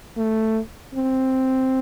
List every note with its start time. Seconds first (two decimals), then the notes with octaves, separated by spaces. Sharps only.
0.18 A3
0.95 C4